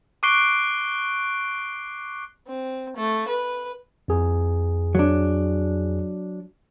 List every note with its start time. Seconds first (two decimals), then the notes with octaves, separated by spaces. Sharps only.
0.23 C#6 D6 F#6 C7 D7 G7
2.47 C4
2.96 A3
3.28 B4
4.08 F2 G#4
4.95 F#3 D4